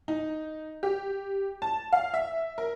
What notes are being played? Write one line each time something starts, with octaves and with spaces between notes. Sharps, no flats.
D#4
G4
A5
F5
E5
A#4